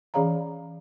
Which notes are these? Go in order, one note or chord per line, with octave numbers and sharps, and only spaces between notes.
E3 C#4 G#4 C#5 F5 A#5